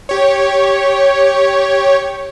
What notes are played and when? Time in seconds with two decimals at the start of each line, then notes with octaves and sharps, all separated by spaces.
0.09 G4 C#5